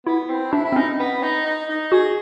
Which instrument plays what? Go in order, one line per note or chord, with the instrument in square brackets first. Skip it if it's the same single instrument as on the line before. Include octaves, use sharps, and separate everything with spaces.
[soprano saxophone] B3 [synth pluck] E4
[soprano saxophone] C4
[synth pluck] D4 [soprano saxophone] E4
[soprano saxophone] E4
[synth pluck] C4
[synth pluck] C#4 [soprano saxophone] D#4
[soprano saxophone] B3
D#4
D#4
D#4
[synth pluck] F#4 [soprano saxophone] G#4